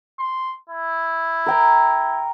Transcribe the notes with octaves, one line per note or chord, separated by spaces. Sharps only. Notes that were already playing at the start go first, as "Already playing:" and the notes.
C6
E4
A#4 G5 A#5